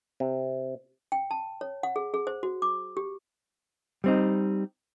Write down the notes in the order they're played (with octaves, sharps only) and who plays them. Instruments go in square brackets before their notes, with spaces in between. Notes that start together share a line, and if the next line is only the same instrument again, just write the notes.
[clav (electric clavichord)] C3
[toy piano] G5
A5
C#5
F#5
G#4
G#4
C5
F#4
D6
G4
[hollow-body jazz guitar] G3 C4 D#4